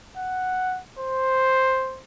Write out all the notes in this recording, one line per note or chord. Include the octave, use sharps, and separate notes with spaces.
F#5
C5